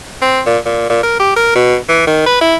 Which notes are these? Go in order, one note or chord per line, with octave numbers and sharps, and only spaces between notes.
C4
A#2
A#2
A#2
A#4
G4
A#4
B2
E3
D#3
B4
E4